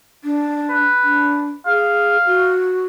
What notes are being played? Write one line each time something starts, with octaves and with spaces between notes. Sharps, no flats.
D4
B4
D4
G#4 F5
F#4